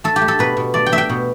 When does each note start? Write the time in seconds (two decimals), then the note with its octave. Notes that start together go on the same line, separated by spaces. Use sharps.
0.04 A3 A4
0.16 G4
0.21 A3
0.28 A4
0.39 B2 B4
0.57 B2
0.74 A3 D5
0.86 G5
0.92 A3 E5
0.98 G5
1.09 B2